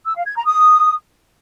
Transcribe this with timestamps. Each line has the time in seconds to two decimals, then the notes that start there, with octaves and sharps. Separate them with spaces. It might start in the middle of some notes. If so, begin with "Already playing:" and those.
0.05 E6
0.15 F5
0.25 G#6
0.35 A#5
0.45 D#6